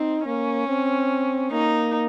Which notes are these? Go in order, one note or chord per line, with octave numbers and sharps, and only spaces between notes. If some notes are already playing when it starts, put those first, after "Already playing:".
Already playing: C4 D#4
A#3 C#4
C4
A#3 D#4